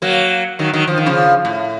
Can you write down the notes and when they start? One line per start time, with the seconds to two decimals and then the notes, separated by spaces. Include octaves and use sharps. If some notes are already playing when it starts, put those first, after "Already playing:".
0.02 F#3 A#3
0.59 D#3 F#3
0.74 D#3 F#3
0.87 F3
0.98 D#3
1.06 C#3 F3
1.45 A2